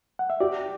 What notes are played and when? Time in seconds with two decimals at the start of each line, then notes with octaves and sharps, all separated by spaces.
0.19 F#5
0.30 E5
0.40 G4 D5